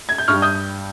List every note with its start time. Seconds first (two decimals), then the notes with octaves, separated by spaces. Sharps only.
0.09 G#6
0.18 G6
0.28 G2 G3 C#6 F6
0.42 D#6 G6